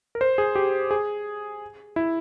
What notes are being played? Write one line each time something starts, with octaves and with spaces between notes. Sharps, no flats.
A#4
C5
G#4
G4
G#4
E4